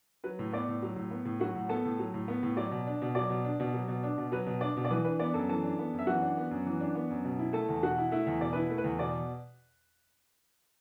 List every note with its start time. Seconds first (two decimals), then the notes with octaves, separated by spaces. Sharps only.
0.24 F#3 B4
0.39 A2
0.53 B3 D5
0.68 A2
0.83 F#3
0.96 A2
1.11 B3
1.25 A2
1.40 F#3 F#4 F#5
1.55 A2
1.69 B3 A4 A5
1.85 A2
1.99 F#3
2.14 A2
2.28 B3
2.43 A2
2.57 F#3 D5
2.71 B2
2.87 D4
3.02 B2
3.15 F#3 D5
3.30 B2
3.44 D4
3.60 B2
3.74 F#3
3.88 B2
4.03 D4
4.18 B2
4.32 F#3 B4
4.46 B2
4.61 D4 D5
4.77 B2
4.85 D5
4.91 E3 B4
5.05 D4 B4
5.19 B3 D5
5.34 F#2 A4 A5
5.49 E3 A4 A5
5.64 D4
5.79 B3
5.93 F#2
5.99 E5
6.07 E3 F#4 F#5
6.22 D4
6.37 B3
6.51 F#2
6.66 E3
6.80 D4
6.95 B3
7.10 F#2
7.25 B2
7.39 E4
7.53 A3 A4 A5
7.69 E2
7.83 B2 F#4 F#5
7.98 E4
8.11 A3 E4 E5
8.27 E2
8.41 B2 D5
8.53 E4 B4
8.70 A3
8.78 B4
8.84 E2
8.99 B2 D5